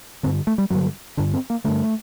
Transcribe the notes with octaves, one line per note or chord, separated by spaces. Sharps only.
G2 D3 C4
A3
G3
G2 D3 F#3
G2 D3 D4
C4
A#3
G2 D3 A3